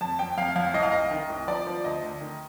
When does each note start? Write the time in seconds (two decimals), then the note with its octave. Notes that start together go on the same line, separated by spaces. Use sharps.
0.01 F2 A5
0.19 F2 G5
0.38 F2 F5
0.56 F2 F5
0.74 C2 D#5
0.83 F5
0.92 C2 D#5
1.11 D#3
1.30 C2
1.48 F3 D5
1.67 F3
1.84 D2 D#5
2.02 D2
2.21 D#3